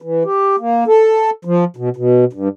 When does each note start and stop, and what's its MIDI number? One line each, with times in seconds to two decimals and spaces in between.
0.02 0.23 52
0.25 0.56 67
0.59 0.84 58
0.87 1.30 69
1.45 1.64 53
1.76 1.89 47
1.96 2.25 47
2.33 2.48 43